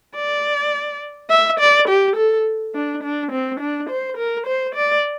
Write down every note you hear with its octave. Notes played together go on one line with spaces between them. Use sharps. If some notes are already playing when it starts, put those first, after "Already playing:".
D5
E5
D5
G4
A4
D4
D4
C4
D4
C5
A#4
C5
D5